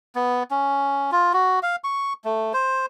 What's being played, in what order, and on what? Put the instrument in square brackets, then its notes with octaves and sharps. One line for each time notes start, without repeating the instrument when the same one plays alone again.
[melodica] B3
C#4
F4
F#4
F5
C#6
A3
C5